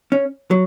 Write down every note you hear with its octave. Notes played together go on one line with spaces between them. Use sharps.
C#4
F#3